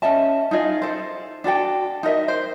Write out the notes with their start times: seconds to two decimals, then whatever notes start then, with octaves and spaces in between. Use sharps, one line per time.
0.02 C#4 D#5 E5 A5
0.51 D#4 F4 G#4 D#5
0.82 A4 C5
1.44 D4 F#4 A4 G5
2.03 D#4 A#4 D#5 E5
2.28 C5